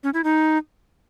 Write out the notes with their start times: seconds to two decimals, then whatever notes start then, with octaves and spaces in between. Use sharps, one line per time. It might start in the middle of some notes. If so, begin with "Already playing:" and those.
0.04 C#4
0.14 E4
0.24 D#4